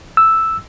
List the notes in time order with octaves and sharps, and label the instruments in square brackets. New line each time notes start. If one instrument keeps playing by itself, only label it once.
[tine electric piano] E6